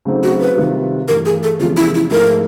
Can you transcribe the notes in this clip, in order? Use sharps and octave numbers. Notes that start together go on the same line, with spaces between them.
C#3 F#3 A3 C4 D#4
F#4
B4
C3 D#3 G3 C4 F4
G2 E3 A3 A#4
G#4
A4
E2 C3 F3 G#3 C#4 F4
E4
E4
G#2 F3 A3 A#4